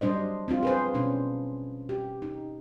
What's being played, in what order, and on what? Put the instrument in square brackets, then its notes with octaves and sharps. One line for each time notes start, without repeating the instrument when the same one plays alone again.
[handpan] F#3 G3 D4 C5 D#5
C4 D4 F4
G#4 B4 C5
B2 C#4 D4
G4
D#4